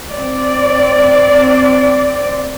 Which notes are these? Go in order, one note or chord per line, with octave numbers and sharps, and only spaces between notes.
C4 D5